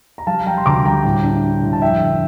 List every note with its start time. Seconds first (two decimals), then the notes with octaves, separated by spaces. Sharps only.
0.18 A#5
0.27 G3 F5 A5
0.46 G3 G5 A#5
0.57 C6
0.66 D2 A#5 D6
0.85 G3 G5 A#5
1.05 A2
1.24 D4
1.43 D4
1.63 A2
1.73 A5
1.81 F2 E5 G5
2.01 D3